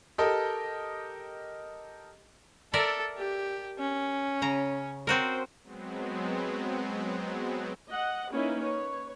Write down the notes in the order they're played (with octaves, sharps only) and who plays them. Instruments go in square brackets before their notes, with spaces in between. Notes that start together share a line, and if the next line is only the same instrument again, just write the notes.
[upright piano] G4 A4 A#4 D#5
[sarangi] A4 [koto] A#4 D5 E5
[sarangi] G4
C#4
[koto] C#3 A#5
[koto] C4 F#4 A#4 [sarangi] C5
[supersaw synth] F#3 G#3 B3 C4
[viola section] D#5 F#5
A#3 C#4 D#4 E4 B4
B4 C#5